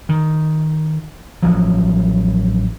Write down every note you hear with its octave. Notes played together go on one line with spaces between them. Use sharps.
D#3
A1 F3 F#3